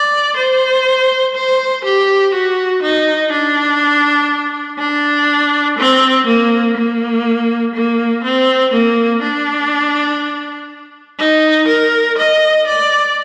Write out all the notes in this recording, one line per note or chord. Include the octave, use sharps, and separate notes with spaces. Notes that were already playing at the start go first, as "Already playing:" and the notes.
Already playing: D5
C5
C5
G4
F#4
D#4
D4
D4
C4
A#3
A#3
A#3
C4
A#3
D4
D#4
A#4
D#5
D5